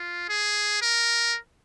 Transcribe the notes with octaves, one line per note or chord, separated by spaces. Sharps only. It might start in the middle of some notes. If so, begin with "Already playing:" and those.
Already playing: F4
G#4
A#4